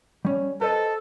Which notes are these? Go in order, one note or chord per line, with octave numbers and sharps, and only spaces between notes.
G3 C#4
A4 B4 C5 D#5